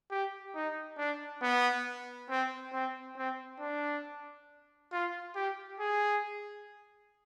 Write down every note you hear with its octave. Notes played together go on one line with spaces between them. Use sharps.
G4
D#4
D4
B3
C4
C4
C4
D4
F4
G4
G#4